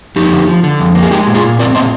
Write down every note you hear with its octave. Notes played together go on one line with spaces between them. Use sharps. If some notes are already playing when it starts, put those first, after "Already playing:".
F2 D#4 G4
D3
F3
D3
F2
A#3
G#4
G#3 D#4 G4
A#2
F4 G#4
A#2
C4 A#4 D5
A#2 C5 D#5